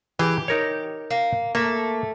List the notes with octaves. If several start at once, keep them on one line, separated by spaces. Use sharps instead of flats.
E3 G4 G#4
D#4 A#4 C#5
A#3
A3 A#3 E5